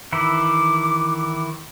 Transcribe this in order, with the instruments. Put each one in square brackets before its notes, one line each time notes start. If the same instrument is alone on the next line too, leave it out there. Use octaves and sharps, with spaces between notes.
[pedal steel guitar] D#3 E3 E4 [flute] D6